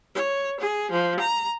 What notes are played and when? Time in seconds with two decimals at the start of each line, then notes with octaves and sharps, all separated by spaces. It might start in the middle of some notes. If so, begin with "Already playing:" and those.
0.14 C#5
0.60 G#4
0.91 F3
1.20 A#5